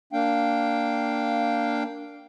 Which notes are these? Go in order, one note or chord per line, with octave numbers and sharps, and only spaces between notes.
A#3 D4 F5 G5